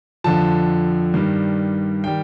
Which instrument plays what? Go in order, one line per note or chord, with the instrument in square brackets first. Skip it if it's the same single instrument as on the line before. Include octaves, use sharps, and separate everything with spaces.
[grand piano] F2 D3 F3 A5
G2 D#3 G3
D#3 G3 G5